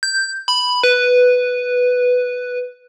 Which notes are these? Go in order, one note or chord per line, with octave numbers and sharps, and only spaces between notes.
G6
B5
B4